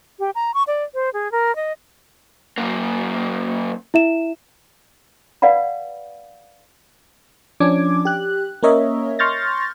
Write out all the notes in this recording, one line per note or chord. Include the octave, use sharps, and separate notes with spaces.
G4
A#5
C#6
D5
C5
G#4
A#4
D#5
F#2 A#3
E4 E5 E7
B4 D5 F5 F#5 B5
F3 C#4 D4 D6 G#6
G4 F#6
A#3 C#4 A#4 C#5 D#5 E5
C6 C#6 F6 G6 A6 A#6